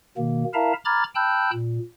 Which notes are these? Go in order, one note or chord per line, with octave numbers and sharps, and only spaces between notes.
B2 D#3 A#3
E4 A#4 E5 F5 A5 A#5
A#5 B5 D6 F6 G#6 A6
G5 A5 B5 E6 F#6 G6
A#2